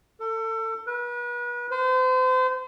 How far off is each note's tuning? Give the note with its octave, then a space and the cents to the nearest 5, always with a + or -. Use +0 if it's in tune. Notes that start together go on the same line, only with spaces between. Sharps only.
A4 +30
B4 -35
C5 -35